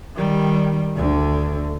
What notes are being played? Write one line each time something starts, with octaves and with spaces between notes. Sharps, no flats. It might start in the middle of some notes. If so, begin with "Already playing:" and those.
D#3 G3
D2 D3